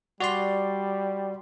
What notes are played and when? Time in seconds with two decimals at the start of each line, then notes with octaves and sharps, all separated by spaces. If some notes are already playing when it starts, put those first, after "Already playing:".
0.20 G3 F#4 D5 C6